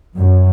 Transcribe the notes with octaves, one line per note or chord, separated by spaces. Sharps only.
F#2